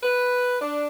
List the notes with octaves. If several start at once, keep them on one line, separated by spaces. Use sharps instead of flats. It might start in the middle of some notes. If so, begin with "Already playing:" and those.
B4
D4